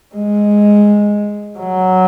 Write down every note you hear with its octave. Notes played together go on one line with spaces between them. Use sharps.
G#3
F#3